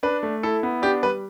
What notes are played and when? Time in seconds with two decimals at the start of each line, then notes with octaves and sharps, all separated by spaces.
0.03 D4 B4
0.23 A3
0.43 E4 A4
0.63 B3
0.82 D4 G4
1.03 G3 B4